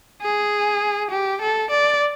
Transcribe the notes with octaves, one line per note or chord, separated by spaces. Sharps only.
G#4
G4
A4
D5